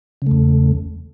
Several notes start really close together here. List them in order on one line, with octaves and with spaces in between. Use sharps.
C#3 A3 E2